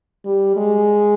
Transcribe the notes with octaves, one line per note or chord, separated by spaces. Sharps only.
G3
G#3